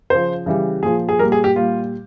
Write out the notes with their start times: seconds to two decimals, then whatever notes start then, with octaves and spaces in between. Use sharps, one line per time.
0.10 C#3 F3 C5
0.46 C#3 E3 G3
0.82 A#2 F3 G#4
1.09 G#4
1.19 G3 A#4
1.23 A#2
1.32 G#4
1.44 G4
1.56 A#2 G3 F4